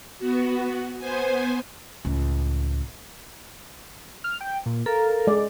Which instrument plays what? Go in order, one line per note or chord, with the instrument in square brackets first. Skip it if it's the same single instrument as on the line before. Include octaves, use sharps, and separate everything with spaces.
[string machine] B3 F#4
B3 C5 G#5
[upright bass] C#2 A2
[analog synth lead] F6
G5
A#2
[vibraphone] A4 F5 [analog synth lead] A#4
[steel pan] G#3 D5